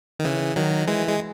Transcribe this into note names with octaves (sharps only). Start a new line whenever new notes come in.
D#3
C#3 E3
D#3 F#3
E3 G#3
G#3